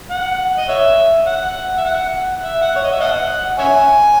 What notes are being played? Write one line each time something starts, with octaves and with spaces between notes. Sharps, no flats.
F#5
D#5
C#5 E5
F#5
E5
F#5
E5
F#5
C#5
D#5
E5
D#5 F#5
C#5 E5 G#5